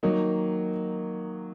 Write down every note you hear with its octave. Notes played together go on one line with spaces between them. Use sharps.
D#3 F#3 A#3 D#4